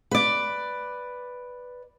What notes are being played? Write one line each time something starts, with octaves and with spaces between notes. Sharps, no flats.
B4 D5